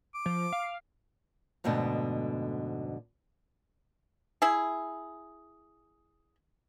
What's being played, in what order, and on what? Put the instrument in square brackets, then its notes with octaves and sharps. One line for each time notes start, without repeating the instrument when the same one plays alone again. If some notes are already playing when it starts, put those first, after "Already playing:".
[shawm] D6
[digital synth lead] F3
F5
[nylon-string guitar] F2 G#2 B2 D3 A3 B3
[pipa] E4 G#4